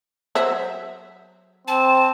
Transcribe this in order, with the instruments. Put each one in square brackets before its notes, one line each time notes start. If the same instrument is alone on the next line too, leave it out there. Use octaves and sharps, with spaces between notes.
[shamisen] F#3 C5 E5
[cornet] C4 [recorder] A5